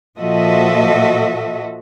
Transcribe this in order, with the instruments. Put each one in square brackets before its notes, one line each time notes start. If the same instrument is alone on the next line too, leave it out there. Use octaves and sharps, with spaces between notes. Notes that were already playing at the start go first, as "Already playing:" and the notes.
[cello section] A#2 F3 F#4 A4 D#5 E5